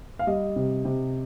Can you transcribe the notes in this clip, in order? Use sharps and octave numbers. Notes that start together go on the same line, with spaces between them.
F5
G3 D#5
C3
C3